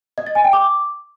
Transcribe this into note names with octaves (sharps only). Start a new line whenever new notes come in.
D#5
A6
G#5
G5
D6